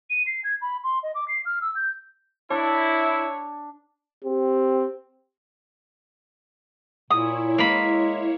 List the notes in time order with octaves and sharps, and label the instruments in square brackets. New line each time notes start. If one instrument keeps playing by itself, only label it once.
[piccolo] D#7
C7
G#6
B5
C6
D#5
D6
C7
F6
E6
G6
[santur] D4 [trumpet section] E4 [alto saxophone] C#5
[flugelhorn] C4 [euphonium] G4
[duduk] A#2 [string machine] E4 C#5 [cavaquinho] D#6
[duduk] G#3 [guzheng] A#3 B5